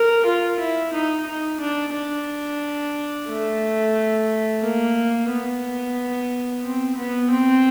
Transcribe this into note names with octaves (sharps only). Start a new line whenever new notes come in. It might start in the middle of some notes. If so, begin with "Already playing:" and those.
Already playing: A#4
F4
E4
D#4
D#4
D4
D4
A3
A#3
B3
C4
B3
C4